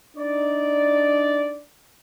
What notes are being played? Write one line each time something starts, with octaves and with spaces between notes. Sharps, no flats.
D4 D#4 D5